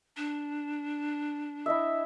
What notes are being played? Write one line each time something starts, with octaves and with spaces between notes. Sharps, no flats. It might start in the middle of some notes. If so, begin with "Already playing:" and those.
D4
E4 D#5 E5